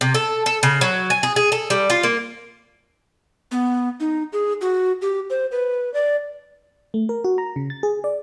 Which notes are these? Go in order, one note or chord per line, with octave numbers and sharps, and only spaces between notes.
C3
A4
A4
C#3
F#3
G#5
G#4
G#4
A4
G3
F4
A#3
B3
D#4
G#4
F#4
G4
C5
B4
D5
A3
A#4
F#4
A#5
C#3
A6
G#4
D5